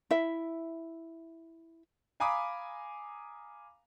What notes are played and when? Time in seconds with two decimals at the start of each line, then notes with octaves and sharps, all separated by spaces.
0.11 E4 E5
2.20 F5 G#5 A#5 B5 D6 D#6